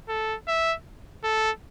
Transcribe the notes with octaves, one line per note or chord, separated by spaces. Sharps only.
A4
E5
A4